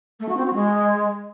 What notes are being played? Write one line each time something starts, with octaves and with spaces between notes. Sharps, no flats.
A3
F#4
C4
F#4
G#3